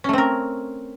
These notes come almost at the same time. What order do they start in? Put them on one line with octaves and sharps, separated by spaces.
C#4 A3 C4 A#4